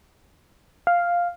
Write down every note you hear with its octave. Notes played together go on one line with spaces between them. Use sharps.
F5